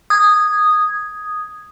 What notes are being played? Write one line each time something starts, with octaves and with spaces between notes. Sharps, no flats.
D#6 G#6